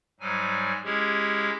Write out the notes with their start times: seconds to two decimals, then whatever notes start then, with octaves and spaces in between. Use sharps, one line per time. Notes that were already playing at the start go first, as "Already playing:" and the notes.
0.20 G#2 F#3 G3 G#5
0.84 G#3 C#4 E4 G4 G#4